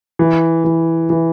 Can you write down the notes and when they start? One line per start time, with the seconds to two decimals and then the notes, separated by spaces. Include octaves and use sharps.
0.19 E3
0.64 E3
1.10 E3